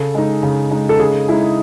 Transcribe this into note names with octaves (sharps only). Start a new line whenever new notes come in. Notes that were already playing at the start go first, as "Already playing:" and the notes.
Already playing: C#3 A4
G#3 D#4
C#3
G#3 D#4
A4
C#3 G#4
G#3 D#4 E4